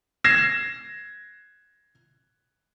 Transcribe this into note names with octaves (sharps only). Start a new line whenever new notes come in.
G#6 A#6 C7 E7